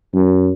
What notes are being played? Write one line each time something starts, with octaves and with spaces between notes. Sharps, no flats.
F#2